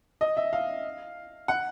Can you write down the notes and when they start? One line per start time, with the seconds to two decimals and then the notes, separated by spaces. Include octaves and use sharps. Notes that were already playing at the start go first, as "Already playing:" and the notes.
0.21 D#5
0.37 E5
0.53 F5
1.48 F#5